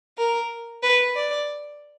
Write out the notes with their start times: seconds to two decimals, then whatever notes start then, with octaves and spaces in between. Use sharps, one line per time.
0.18 A#4
0.83 B4
1.15 D5